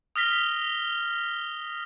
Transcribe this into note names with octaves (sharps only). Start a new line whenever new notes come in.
D#6 F6 A#6 B6 G7